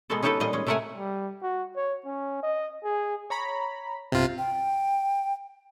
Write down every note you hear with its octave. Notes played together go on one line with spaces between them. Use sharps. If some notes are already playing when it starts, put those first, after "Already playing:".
B2 G#3 A#3 B3 F#4 A4
C#4 D#4 F#4 G4 A4 B4
A#2 G3 A#3 D#5
G#3 C#4
C3 A3 A#4 E5 F#5 G#5
G3
F#4
C#5
C#4
D#5
G#4
C#5 A#5 B5
B1 G2 C3 F4
G5